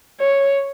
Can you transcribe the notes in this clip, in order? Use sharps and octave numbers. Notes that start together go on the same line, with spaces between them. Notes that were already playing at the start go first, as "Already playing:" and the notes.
C#5